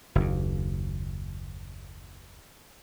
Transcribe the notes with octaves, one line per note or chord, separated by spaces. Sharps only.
F#1 D#2